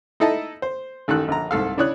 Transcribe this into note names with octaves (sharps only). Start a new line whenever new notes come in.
D#4 E4 A4 D#5 E5 A5
C5
A1 D#3 A4 F#6
A#1 D3 A#5
C2 G#2 A4 F5
C#3 D4 E4 C#5 D#6 F#6